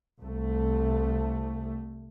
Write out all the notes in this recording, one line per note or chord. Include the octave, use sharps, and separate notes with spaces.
C2 A3